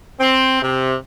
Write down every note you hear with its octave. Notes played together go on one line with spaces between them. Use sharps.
C4
C3